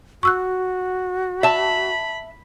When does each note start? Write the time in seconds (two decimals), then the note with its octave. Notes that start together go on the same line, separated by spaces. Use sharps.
0.23 F#4 C#6 E6 F#6
1.43 E5 A5 B5